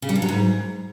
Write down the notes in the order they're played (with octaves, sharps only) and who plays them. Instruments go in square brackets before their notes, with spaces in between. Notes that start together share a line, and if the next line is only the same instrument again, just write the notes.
[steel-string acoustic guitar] C#3
G3
G2
F#3
G#2